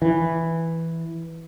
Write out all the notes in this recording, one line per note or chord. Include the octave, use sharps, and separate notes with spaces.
E3